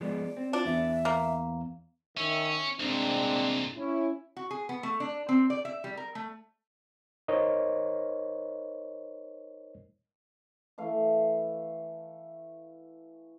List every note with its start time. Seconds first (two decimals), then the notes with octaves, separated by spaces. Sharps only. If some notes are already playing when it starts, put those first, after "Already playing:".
0.01 F3 G#3 B3 D5
0.37 C4
0.53 D4 F4
0.65 E2 B3 E5
1.05 A#3
2.17 D#3 C#4 E5
2.80 C2 A#2 G#3 C4 D4
3.77 C#4 E4
4.37 F#4
4.51 G#4
4.69 B3
4.83 A3
5.00 D4
5.29 C4
5.50 D5
5.65 E5
5.84 G3
5.97 A#4
6.15 A3
7.28 D#4 A#4 C5 C#5 D#5
10.78 E3 A3 F5